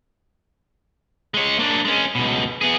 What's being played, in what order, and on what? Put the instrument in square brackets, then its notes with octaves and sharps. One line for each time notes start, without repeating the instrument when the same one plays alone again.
[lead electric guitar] G#3 C#5
A#3 D4
G#3 C#4
C#2 B2
B3 G#4